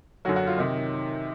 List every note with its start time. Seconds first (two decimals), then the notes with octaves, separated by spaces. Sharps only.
0.25 F#2 D3 F#3 F#4
0.36 F#4
0.47 F4
0.58 C3 D#3 D#4